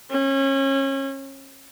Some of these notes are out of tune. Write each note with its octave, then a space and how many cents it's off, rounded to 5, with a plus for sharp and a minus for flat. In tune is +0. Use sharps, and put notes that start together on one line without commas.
C#4 -30